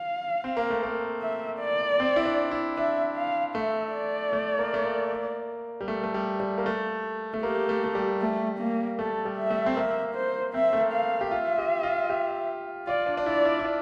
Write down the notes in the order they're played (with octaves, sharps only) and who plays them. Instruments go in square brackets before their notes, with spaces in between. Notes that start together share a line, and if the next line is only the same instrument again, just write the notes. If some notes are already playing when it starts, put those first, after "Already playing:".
Already playing: [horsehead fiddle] F5
[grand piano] C4
A#3
A3
A#3
[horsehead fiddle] E5
D5
[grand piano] C4
E4
D4
E4
[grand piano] D4 [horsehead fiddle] E5
[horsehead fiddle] F5
[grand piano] A3 [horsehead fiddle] E5
[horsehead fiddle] D5
[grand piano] A3
A#3
A3
A#3
G3
A3
A3
G3
G3
A#3
A3
A3
[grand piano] A#3 [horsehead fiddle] G4
[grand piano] A3
A3
G3
[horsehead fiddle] A3
A#3
[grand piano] A3 [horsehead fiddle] A4
[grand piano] G3
[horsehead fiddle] E5
[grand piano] A3
C4
[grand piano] A#3 [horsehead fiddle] E5
[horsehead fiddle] C5
[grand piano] C4 [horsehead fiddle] E5
[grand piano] A3
A#3
[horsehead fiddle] F5
[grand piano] G4
[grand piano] F4 [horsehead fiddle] E5
[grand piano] G4
F4
G4
[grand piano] F4 [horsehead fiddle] D5
[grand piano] D4
D4
[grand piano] E4 [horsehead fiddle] D5
[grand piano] E4
E4
D4